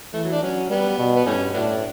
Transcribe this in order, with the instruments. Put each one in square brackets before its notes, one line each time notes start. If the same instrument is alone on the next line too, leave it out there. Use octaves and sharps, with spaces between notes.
[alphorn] E3 [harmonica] A3
[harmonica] F#3
D4
[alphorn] F#3 [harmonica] C#4
[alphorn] G3 [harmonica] B3
[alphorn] B2
[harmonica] B3
[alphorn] G2 [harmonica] E3 A3 C#4
[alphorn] A2 [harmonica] F#3 B3 D4